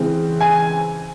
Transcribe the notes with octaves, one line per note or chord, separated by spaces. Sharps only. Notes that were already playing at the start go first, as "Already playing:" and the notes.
Already playing: C#3 E3 G#3 C4
G#5